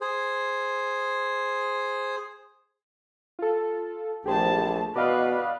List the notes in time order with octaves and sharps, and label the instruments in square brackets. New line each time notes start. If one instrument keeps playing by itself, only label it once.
[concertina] G#4 C5
[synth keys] F4 A4
[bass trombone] A#1 [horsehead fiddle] A3 A5 [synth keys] G4 G#4 C5
[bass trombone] B2 [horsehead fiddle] B4 [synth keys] D5 D#5 F5